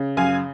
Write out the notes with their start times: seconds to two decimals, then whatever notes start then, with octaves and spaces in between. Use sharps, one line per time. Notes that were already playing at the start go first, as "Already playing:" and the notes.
Already playing: C#3
0.17 F#2 F5 G#5